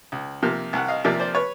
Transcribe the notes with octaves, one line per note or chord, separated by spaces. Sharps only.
C#2
C3 F3 A#3
C2 F#5
D#5 F5
C3 F3 A#3 D5 E5
C5 D5
B4 C#5